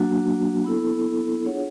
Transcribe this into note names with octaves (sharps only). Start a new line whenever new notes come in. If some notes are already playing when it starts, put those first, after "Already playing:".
Already playing: F#3 A#3 D4 F#4
B3 E4 A4
D4 F4 G#4 C#5 F#5